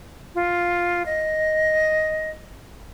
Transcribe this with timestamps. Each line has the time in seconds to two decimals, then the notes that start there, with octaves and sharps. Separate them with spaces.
0.35 F4
1.06 D#5